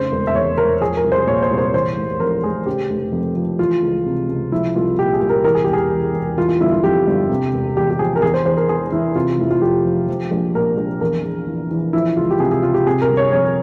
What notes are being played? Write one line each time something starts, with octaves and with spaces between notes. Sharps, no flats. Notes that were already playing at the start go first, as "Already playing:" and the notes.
Already playing: F1 C#3 C5
E1
E5
E2 C#5
E1 A#4
F3 G#4
A#4
C2
C5
A#2 C#5
C5
C2
C5
E3 C5
F1
F2 A#4
F1 G#4
C#3 G4
F1
F2
F3
E3 F4
C#2
C3
C#2
F3 E4
C2 F4
A#2 G4
G#4
C2
A#4
E3 A#4
G#4
E1 G4
G#4
E2
E1
E3 F4
F4
G1 E4
F4
F2 G4
G1
C3
E1
E2 G4
G4
F3 G#4
A#4
E2 G#4
C5
E2 C5
A#4
E3 G#4
E3 E4
C3 F4
F1 E4
F4
F2 G4
F3
F3
A#1
A#2 A#4
A#1
E2 A#4
E2
E3
E3
F3 E4
C#2 F4
G4
C3 G#4
G#4
C#2 F4
G4
C3 G#4
A#4
G1
C#5
F2 C#5